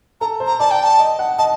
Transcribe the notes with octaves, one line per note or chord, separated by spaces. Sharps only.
A4 A#5
C5
A#5
D5 A5
G5
A5
D#5
F#5
D#5 A5